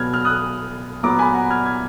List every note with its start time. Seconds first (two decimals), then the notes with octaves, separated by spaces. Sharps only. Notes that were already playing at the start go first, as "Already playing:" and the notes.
Already playing: B2 F#3 B3 F6 G#6
0.14 F6
0.25 D#6 F#6
1.03 A#2 F#3 B3 A#5 D6
1.18 G#5 B5
1.34 F#5 A#5
1.50 F6 G#6
1.66 F6 G#6